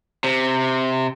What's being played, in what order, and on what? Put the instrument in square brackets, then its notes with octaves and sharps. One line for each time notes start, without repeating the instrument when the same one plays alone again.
[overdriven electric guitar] C3